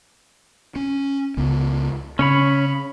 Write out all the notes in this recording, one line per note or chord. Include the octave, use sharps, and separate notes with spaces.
C#4
C#2 C#3 B3
C#3 C#4 C#5 B5